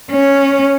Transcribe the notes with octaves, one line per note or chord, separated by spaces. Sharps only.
C#4